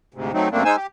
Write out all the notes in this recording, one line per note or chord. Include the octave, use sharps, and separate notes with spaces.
D2 G#2 C3
D#3 F#3 A3 C4 D#4
F#2 C3 A3 A#3 C4 D4
G#3 D#4 C5 G#5 E6
G4